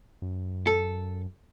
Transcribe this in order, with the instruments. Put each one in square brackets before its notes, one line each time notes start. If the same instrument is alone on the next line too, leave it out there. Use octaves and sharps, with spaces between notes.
[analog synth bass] F#2
[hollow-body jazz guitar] A4